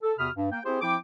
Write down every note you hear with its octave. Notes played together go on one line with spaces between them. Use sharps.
A4
E2 C3 F#4 B5 D#6 F6
G2
A#3 G5
C4 E4 G4 G#4 C5
F3 C4 E4 G5 D6